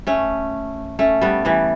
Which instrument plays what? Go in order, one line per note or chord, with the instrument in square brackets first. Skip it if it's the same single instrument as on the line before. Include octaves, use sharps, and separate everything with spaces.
[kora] A3 C#4
A3 C#4
G3 B3
E3 G3